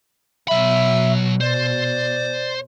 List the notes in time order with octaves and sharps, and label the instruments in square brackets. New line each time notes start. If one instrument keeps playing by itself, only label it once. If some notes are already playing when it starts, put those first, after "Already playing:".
[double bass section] B2 [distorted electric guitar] F#3 B5 [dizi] E5
[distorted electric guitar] C5 [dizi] D5